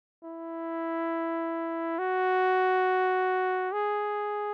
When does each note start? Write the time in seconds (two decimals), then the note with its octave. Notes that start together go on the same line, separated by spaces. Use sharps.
0.24 E4
1.99 F#4
3.73 G#4